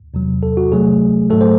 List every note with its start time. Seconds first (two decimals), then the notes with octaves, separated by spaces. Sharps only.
0.14 E2 C3 F#3
0.43 A4
0.57 F#4
0.72 C3 F#3 A3 G#4
1.30 G#2 F#3 A3 A4
1.41 C5